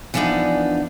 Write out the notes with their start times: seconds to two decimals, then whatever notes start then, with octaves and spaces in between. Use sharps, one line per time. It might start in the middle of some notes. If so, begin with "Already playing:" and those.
0.14 E3 F3 A#3 B3 D4 D#4